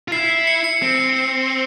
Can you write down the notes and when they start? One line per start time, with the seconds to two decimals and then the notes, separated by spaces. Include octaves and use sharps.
0.08 F4
0.12 E4 C7
0.47 C#7
0.64 C#7
0.82 C4